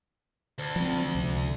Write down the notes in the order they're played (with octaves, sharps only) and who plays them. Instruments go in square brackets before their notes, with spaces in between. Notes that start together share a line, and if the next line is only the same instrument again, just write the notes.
[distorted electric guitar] D2
[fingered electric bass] F3 C4
C#2 C3